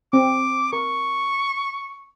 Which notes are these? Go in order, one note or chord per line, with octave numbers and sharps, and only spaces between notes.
C4 D6
A#4 C#6